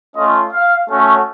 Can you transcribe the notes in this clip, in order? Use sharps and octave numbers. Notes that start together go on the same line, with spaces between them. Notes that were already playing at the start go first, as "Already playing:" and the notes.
A3 C#4 F4 D#5
F5
A3 C#4 F#4